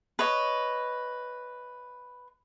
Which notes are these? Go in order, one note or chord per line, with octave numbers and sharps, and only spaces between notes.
B4 C#5 D#5